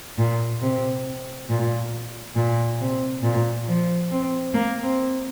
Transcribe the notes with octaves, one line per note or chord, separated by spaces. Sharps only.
A#2
C3
A#2
A#2
C3
A#2
F3
C4
A#3
C4